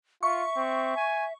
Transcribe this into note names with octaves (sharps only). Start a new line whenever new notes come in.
F4 E5 C#6
C4
G#5